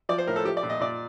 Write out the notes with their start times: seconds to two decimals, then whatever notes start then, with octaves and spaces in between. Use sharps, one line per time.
0.09 F3 D5
0.18 C5
0.27 A2 A#4
0.36 A4
0.45 F3 G4
0.57 D5
0.63 A#2
0.70 D#5
0.81 A#2 D5